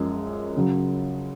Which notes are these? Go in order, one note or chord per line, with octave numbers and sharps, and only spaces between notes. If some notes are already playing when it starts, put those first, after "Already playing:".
Already playing: F#2 F3 G#3 C#4
C#3 F#3